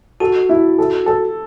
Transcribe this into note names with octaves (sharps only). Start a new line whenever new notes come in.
F#4 A4
E4
A4
A4